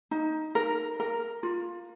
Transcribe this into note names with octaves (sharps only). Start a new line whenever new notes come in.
D#4
A#4
A#4
F4